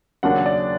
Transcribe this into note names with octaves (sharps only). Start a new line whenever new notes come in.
D#2 C#3 F#3 A#3 D4 F#5
D5